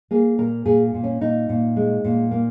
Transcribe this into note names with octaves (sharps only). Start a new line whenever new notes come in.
A#3 G#4
A#2 A#4
A#2 G#4
A#2
C#4
A#2 D#4
A#2
G#3
A#2
A#3